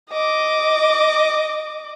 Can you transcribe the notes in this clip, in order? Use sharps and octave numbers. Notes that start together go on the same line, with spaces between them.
D#5 D6